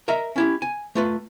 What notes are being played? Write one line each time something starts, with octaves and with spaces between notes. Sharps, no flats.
A#4 D#5 E5 A#5
C#4 E4 G4
G#5
A3 F4 B4